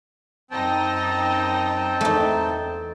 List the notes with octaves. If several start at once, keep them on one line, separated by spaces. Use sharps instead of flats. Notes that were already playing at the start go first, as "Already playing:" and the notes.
F#2 C4 D#4 G5 A5 A#6
E2 A3 D#4